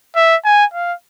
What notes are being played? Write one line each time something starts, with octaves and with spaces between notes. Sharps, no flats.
E5
G#5
F5